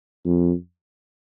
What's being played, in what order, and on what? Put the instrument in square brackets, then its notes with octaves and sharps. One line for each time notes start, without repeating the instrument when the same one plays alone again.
[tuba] F2